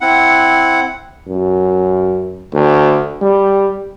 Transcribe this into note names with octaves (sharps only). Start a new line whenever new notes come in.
C4 E4 F#5
F#2
D2
G3